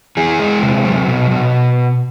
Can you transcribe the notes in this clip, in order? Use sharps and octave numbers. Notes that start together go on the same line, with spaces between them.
E3 G#4
G#3
C3
F#3
B2
B2